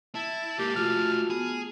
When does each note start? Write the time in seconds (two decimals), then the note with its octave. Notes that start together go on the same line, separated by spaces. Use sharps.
0.15 E4 A5
0.59 G#2 A#3 G4
0.76 F3 A3 F4 F#4 F6
1.30 B3 G#4